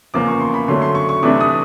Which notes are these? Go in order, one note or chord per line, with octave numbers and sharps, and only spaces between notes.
E2 C#3 F3 A#3 D6
C#6
C6
B5
D3 F#3 A3 C#4 C6
C6
C#6
C#6
C3 E3 A3 D4 D6
D#6